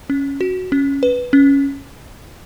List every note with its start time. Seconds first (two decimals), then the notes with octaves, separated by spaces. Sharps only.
0.10 C#4
0.41 F#4
0.72 C#4
1.03 B4
1.33 C#4